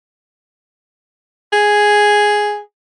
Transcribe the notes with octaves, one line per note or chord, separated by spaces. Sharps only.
G#4